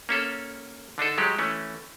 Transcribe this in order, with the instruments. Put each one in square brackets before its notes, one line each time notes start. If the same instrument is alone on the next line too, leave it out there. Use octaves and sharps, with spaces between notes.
[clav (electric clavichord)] A#3 C#4 A4
D3 D4 D#4 A4
F#3 G#3 G4
E3 A3 C#4